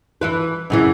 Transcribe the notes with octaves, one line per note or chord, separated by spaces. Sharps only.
E3 E4 B4
F#2 C#3 E3